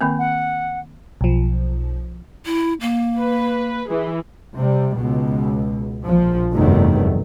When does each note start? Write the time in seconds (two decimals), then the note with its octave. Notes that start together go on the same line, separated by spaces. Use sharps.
0.01 D#3 A#3 C4
0.19 F#5
1.21 B1 F3
2.46 E4
2.81 A#3
3.18 B4
3.89 E3 G#4
4.55 C3 G3
4.96 C#2 B2
6.04 A#1 F3
6.53 F1 E2 G2 D#3 F#3 A3